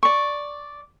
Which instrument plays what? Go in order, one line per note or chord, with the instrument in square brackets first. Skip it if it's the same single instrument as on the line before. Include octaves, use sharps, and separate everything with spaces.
[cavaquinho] D5 C#6